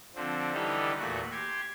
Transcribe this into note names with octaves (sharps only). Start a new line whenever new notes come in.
D3 F3 C4
D3 E3 G3 D#4 G4 A4
E2 A#2 A3 F#4 F#6
G4 C6 G#6